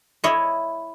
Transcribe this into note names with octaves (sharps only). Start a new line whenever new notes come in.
E4 C#5 D#5